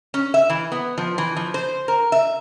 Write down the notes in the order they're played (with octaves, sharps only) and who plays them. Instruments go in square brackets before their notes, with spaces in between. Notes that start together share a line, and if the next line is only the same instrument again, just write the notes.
[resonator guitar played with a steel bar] C#4
E5
E3
B3
F3
E3
F3
C5
A#4
E5